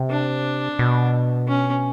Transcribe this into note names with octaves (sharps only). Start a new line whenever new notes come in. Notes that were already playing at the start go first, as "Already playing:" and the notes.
Already playing: C3
D4
B2
C#4